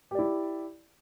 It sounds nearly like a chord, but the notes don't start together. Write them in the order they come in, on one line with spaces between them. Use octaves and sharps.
G4 D5 E4